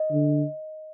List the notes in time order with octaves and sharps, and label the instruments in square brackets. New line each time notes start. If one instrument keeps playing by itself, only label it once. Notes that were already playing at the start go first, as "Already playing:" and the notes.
Already playing: [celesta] D#5
[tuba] D3